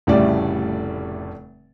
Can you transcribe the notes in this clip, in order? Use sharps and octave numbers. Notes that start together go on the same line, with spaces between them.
F1 A2 C#3 G3 A3 D5